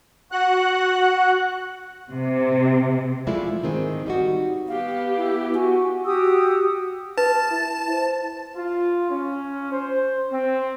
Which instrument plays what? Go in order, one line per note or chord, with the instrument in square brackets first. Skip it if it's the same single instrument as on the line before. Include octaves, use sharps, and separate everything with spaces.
[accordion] F#4 F#5 F#6
[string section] C3
[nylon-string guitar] F3 G#3 A3 E4 F4 D5
G#2 D#3 C4 G#4
G3 D#4 F#4
[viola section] B3 G4 [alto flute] F5
[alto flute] E4
[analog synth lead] F#4 [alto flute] G#5
[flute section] F#4 G4 D#6 E6
[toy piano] B4 [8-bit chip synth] A5
[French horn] E4
C5
[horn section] F4
C#4
C5
C4